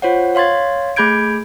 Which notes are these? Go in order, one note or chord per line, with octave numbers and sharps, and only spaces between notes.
F4 C5 C#5 F#5
C#5 F5 C6 G#6 A6
A3 G#4 B5 G6 G#6 D7